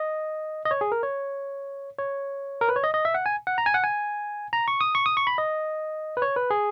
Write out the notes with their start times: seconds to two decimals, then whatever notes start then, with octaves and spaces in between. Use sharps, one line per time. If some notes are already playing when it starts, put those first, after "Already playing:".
Already playing: D#5
0.65 D#5
0.71 C#5
0.81 G#4
0.92 A#4
1.03 C#5
1.98 C#5
2.61 A#4
2.69 B4
2.76 C#5
2.84 D#5
2.94 D#5
3.05 E5
3.14 F#5
3.26 G#5
3.47 F#5
3.58 A#5
3.66 G#5
3.74 F#5
3.84 G#5
4.53 A#5
4.68 C#6
4.81 D#6
4.95 C#6
5.06 D#6
5.17 C#6
5.27 B5
5.38 D#5
6.17 B4
6.22 C#5
6.36 B4
6.50 G#4